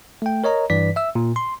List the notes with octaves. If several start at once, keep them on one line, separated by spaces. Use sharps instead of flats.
A3 G5
A#4 C#5 D#5 A#5
G2 E3 B4 D5 B6
E5 E6
A#2
C6